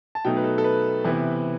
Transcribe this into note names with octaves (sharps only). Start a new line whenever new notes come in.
A5
B2 F#3 A3 D#4 G5
B4
A4
A4
B4
C3 E3 B3 E4